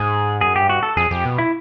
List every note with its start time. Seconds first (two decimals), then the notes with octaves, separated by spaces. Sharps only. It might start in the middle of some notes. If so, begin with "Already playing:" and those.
Already playing: G#2 G#4
0.41 F#2 G#4
0.56 G4
0.61 G2
0.69 F#4
0.83 A4
0.97 F2 G#4
1.11 F2 G4
1.25 B2
1.38 E4